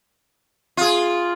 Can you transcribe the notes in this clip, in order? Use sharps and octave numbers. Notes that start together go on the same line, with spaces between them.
F4 G#4